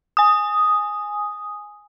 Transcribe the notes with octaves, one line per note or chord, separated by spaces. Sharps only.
G#5 D#6